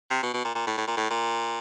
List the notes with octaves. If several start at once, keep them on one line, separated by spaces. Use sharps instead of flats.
C3
B2
B2
A#2
A#2
A2
A2
A#2
A2
A#2